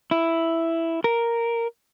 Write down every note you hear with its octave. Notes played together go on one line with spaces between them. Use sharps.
E4
A#4